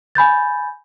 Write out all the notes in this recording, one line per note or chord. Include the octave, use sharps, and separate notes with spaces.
G#5 B5 G6 A6